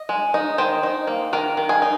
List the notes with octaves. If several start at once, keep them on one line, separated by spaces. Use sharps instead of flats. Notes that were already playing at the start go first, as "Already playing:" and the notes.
Already playing: D#5
G#3
D#4
D#3 C5
D#4
A#3
D#3 A#4
D#3
G#4
D#4